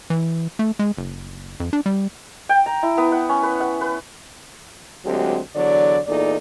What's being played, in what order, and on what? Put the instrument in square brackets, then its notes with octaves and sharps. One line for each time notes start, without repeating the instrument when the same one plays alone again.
[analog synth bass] E3
A3
G#3
F#1
F2
D4
G3
[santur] G5
A#5
E4
B3
F#5
C#4
B4
F#5
B4
[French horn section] D2 F#3 G#3 C4 G4
E2 D3 F#3 D5
E2 A#2 D#4 A4 D5